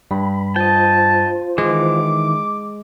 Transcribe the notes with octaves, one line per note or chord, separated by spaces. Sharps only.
G2 B5
F4 C5 D#5 G5 A5
D#3 E3 G#3 D6